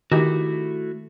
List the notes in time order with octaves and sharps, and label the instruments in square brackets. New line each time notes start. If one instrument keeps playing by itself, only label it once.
[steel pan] D#3 G4 [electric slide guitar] A3 E4 F#4